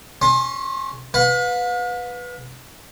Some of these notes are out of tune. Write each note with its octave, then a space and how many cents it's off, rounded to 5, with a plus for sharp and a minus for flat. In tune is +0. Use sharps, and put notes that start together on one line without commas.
C#4 +0 C6 +30
B4 +0 F5 +45